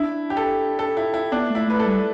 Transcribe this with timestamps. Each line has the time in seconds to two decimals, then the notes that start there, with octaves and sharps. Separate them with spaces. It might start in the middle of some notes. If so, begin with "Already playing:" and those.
Already playing: D4 E4
0.30 G4
0.37 A4
0.79 A4
0.97 E4
1.14 E4
1.32 B3 D4
1.49 A3
1.55 E4
1.67 A3 B4
1.79 A4
1.85 G3